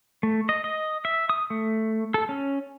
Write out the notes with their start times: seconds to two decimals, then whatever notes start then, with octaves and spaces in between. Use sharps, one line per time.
0.23 A3
0.49 D#5
0.64 D#5
1.05 E5
1.29 D#6
1.50 A3
2.14 A4
2.29 C#4